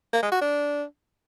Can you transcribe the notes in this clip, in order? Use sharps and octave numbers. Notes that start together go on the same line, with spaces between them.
A#3
G#3
F#4
D4